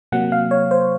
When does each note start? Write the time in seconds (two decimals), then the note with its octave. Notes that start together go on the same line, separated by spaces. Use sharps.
0.12 C3 F#3 A#3 F#5
0.32 F5
0.51 C#5
0.71 C5